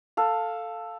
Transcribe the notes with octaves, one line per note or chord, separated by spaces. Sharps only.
A4 F5